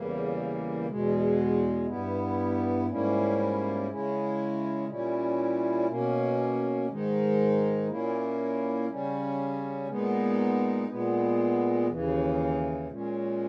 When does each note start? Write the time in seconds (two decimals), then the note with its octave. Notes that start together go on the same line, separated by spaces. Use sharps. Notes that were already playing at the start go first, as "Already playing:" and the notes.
Already playing: E2 C#3 E3 G3 A#3
0.87 E2 B2 G#3
1.86 G2 G3 B3 E4
2.87 G#2 G3 A#3 C#4 E4
3.87 C#3 G#3 C#4 E4
4.86 A#2 G3 C#4 E4
5.86 B2 A#3 C#4
6.87 G#2 D#3 G#3 D#4
7.87 A#2 A#3 C#4 E4
8.87 C#3 G3 C#4
9.87 A#2 G#3 B3 D#4
10.87 A#2 G#3 B3
11.87 D#2 C#3 E3
12.87 A#2 G#3 C#4